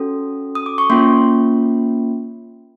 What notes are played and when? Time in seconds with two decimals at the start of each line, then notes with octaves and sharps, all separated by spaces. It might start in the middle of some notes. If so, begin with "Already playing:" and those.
Already playing: C#4 F#4 A4
0.55 D#6
0.66 D6
0.78 C#6
0.90 A#3 C#4 F4 C6